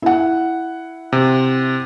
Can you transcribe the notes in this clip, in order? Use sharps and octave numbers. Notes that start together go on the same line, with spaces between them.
E4 F#5
C3